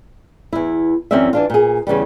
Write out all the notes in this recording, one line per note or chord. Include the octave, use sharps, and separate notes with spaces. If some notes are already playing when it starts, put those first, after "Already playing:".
E2 E4
F#2 E3 C4 C#4 D5 E5
E3 D4 F4
A#2 G#4
E2 C#3 E3 G3